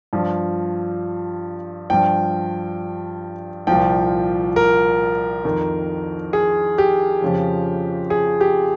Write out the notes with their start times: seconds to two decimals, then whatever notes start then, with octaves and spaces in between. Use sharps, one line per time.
0.13 G2 F3
1.90 G2 F3 G5
3.67 C2 A#2 F3 G5
4.56 A#4
5.44 F2 D#3
6.33 G#4
6.78 G4
7.22 F2 C#3 F3
8.10 G#4
8.41 G4